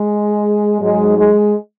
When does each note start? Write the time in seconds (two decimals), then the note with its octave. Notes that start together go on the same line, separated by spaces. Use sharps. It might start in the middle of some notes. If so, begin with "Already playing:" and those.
Already playing: G#3
0.81 G#2 F#3 G#3
1.17 G#3